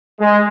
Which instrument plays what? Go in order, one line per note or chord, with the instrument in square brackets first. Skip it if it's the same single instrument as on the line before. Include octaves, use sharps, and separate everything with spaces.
[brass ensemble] G#3